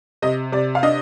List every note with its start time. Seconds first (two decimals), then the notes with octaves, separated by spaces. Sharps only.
0.22 C3 D#5
0.52 C3 D5
0.75 F5
0.83 D4 D#5